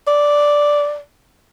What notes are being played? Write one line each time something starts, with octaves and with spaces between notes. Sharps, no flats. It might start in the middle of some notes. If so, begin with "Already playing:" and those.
D5